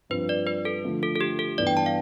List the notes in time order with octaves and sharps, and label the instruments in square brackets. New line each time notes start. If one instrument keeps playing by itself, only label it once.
[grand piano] G2 F3 C4 [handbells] B4
[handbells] D5
B4
A4
[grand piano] D3 F3 A3
[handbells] A4
A4
G4
A4
[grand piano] G2 E3 B3 [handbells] D5
[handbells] G5
A5
F5